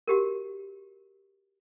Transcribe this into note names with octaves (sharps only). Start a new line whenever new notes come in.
F#4 G4 A#4